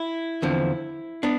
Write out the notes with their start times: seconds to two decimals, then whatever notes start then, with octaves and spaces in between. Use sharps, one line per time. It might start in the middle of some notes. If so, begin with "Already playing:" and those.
Already playing: E4
0.42 E2 D3 F3 C4
1.23 B3 D4